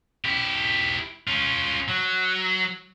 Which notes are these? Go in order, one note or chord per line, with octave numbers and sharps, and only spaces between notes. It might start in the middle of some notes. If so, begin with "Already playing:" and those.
E4 G4
C#4 F4
F#3